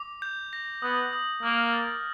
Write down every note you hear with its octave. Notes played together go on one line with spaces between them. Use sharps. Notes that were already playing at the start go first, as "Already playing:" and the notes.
Already playing: D6
G6
A#6
B3 D#6
D#6
A#3 F6
A6